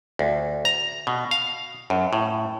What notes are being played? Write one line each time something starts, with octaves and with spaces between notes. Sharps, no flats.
D2
A#5
B2
F5
F#2
A2